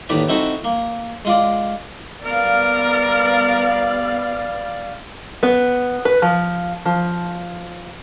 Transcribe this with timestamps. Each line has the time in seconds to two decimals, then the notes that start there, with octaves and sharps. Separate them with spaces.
0.09 D#2 A2 B4 D5
0.29 C4 D#4 E4 F#4 A4
0.64 A#3
1.25 G#3 F4 D5
2.25 G3 B3 A#4 D5 F5
5.43 B3
6.05 B4
6.22 F3
6.85 F3